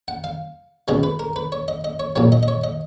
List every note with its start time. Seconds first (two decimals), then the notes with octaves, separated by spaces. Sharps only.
0.08 F#5
0.24 F5
0.88 C#2 B2 G#3 D#5
1.03 B4
1.19 A#4
1.36 B4
1.52 C#5
1.68 D#5
1.84 D#5
2.00 C#5
2.16 A#1 A#2 F#3 C#5
2.32 D#5
2.43 D#5
2.48 C#5
2.64 D#5